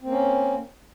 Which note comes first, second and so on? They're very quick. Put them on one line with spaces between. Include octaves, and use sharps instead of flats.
C4 A#3 C#4